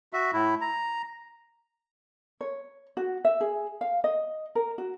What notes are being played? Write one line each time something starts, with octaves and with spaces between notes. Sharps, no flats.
F#4 E5
A2 E4
A#5
C#5
F#4
E5
G#4
F5
D#5
A#4
F#4